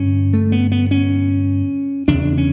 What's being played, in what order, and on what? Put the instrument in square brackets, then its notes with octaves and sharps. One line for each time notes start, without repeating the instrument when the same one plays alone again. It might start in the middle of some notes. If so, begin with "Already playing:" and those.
Already playing: [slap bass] G2 D3 C#4
A3
B3
B3
C#4
E2 C#3 D4
C#4